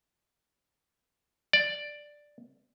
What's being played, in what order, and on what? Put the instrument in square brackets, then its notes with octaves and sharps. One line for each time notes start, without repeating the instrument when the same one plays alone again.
[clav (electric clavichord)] D5